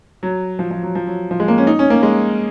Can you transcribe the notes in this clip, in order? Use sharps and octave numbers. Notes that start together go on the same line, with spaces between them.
F#3
F3
F3
F#3
F3
F#3
F3
G#3
A#3
C#4
D#4
C#4
A#3
G#3